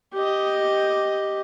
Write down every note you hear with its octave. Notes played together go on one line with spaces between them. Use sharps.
G4 D#5